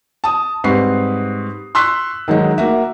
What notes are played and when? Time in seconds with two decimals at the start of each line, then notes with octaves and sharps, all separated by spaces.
0.24 A5 D#6
0.64 G#2 G3 C4 B4 C#6 C7
1.75 C6 C#6 E6 F#6 B6
2.28 D#3 F#3 G#3 D#4
2.58 A#3 F#4 E5